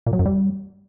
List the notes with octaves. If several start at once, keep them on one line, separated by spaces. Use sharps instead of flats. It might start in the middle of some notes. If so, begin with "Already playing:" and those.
A#2
F#3
F#2
G3